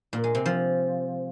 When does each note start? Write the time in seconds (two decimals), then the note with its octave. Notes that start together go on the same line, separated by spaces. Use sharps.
0.13 A#2
0.24 G#3
0.35 C3
0.46 F3